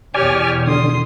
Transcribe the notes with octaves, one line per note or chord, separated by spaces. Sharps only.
E2 B2 G4 C#5 D5 G#5 F6
D3 C6 D#6